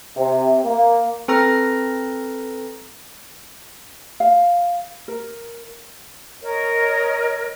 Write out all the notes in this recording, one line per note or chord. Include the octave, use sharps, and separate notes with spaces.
C3
A#3
C4 A4 B4 A#5 F6 A#6
F5
A#4
A#4 C#5 D#5